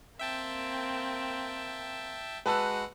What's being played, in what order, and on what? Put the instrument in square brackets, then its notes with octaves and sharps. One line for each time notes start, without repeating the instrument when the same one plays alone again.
[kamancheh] A#3 C4 [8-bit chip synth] E5 G5 A5
[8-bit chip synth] G#3 F#4 F#5 [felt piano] B4 A5 E6